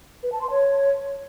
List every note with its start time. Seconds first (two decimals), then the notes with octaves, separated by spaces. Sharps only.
0.23 B4
0.32 A5
0.41 C6
0.51 C#5